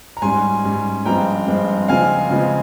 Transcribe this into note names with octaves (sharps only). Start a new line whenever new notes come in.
A#5
G#2 G3 C#4 G#5 C6
G#2 G3 C#4
G2 F3 G#3 C4 G5 A#5
G2 F3 G#3 C4
C#3 F3 G#3 C4 F5 G#5
C#3 F3 G#3 C4